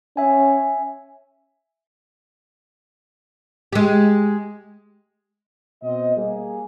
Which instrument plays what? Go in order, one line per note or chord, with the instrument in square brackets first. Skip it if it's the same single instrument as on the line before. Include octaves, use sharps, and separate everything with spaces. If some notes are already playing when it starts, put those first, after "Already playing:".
[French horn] C#4 [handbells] E5 G#5
[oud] G#3 G4
[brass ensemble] B2 C4 D#5
G3 A#3 G#4